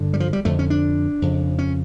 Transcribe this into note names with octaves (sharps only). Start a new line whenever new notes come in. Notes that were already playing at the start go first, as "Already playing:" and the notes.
Already playing: G2 D3
G3
F3
G3
F2 D3 A3
C#4
D4
F2 C#3
C#4